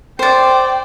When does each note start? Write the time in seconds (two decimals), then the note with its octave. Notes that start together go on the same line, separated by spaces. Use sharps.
0.19 C5 D5 G5